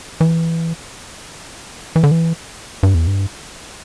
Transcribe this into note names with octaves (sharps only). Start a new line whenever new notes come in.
E3
E3
D3
E3
G2
E2
G2